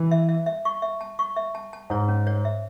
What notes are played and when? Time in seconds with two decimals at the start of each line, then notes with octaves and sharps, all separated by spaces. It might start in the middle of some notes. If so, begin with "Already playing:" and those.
Already playing: E3
0.11 E5
0.29 E5
0.46 E5
0.65 C#6
0.82 E5
1.01 A5
1.19 C#6
1.36 E5
1.55 A5
1.73 A5
1.90 G#2 C#5
2.08 C#4
2.27 C#5
2.45 E5